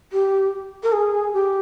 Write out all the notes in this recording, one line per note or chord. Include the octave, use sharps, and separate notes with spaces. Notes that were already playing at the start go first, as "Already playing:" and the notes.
G4
A#4
G#4
G4